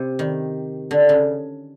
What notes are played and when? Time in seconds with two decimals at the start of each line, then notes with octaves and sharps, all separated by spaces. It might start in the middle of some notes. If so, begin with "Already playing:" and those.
Already playing: C3
0.19 D#3
0.91 D3
1.09 C#3